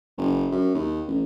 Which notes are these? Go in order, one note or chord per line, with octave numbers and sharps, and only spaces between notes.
F#1
F#2
D#2
A1